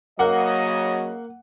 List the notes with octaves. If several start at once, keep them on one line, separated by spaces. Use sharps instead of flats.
C#3 F#3 A#3 D#5 F#5